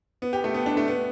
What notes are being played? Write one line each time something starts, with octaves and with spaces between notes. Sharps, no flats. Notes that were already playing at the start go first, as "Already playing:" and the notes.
B3
G4
A3
B3
D4
A3
B3